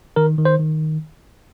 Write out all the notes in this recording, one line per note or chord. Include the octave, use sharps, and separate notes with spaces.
D#3 A#4
D#3
C5
D#3